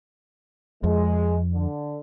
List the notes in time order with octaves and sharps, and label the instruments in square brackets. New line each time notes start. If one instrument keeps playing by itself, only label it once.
[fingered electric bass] F2 [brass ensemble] G#3
[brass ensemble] D3